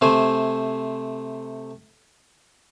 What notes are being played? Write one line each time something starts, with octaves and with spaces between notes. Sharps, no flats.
C3 A3 C5 G#5